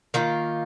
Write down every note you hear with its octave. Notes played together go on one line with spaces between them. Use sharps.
D#3 A#3 F4